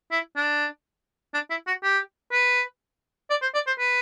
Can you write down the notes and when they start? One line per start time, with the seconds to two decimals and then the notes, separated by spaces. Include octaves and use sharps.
0.11 E4
0.36 D4
1.34 D4
1.50 E4
1.67 F#4
1.83 G4
2.32 B4
3.30 D5
3.42 C5
3.54 D5
3.67 C5
3.79 B4